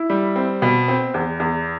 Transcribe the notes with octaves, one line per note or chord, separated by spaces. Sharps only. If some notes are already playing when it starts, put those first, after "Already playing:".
Already playing: E4
G3
C4
B2
C4
E2
E2